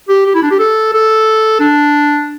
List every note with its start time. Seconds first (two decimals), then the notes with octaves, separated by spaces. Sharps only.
0.09 G4
0.26 G4
0.34 E4
0.43 D4
0.51 G4
0.59 A4
0.93 A4
1.60 D4